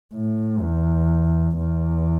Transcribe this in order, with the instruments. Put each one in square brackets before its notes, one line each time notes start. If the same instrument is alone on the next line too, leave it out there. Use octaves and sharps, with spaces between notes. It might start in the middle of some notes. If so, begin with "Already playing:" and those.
[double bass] A2
E2
E2